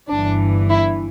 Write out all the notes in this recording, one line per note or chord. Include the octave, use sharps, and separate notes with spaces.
G1 G2 E3 D4
E4